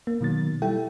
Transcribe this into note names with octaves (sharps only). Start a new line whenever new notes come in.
A#3
B2 D#3 F#3 A6
G3 E4 A4 E5 G5